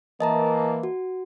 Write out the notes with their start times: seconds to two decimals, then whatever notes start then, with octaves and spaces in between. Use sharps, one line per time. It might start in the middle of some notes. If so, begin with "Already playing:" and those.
0.20 E3 A#3 D#5 A5 A#5
0.83 F#4